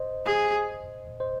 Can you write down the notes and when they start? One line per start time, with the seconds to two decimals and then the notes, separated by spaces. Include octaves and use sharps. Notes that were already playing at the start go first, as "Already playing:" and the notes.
Already playing: C5 D#5
0.25 G#4
1.20 C5 D#5